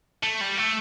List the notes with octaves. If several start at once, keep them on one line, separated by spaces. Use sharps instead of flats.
A3
G3
A3